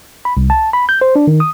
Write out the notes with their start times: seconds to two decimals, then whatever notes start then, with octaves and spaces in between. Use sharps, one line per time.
0.25 B5
0.37 C2
0.50 A5
0.73 B5
0.89 G6
1.01 C5
1.16 D4
1.27 D#3
1.40 D#6